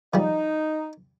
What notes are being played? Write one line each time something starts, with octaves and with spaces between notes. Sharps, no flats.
F3 G3 D#4